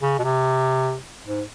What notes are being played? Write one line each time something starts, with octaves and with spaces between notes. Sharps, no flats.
C#3
B2
C3
G#2